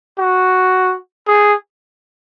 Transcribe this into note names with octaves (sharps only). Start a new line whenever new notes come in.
F#4
G#4